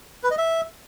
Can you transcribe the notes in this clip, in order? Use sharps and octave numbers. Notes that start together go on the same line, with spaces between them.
B4
D#5
E5